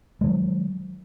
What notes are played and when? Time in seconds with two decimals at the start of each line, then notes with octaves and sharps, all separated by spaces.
0.21 G#3
0.24 D3
0.26 D#3
0.29 F#3